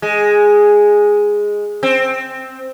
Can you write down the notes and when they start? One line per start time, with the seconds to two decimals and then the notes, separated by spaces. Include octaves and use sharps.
0.02 G#3
1.83 C4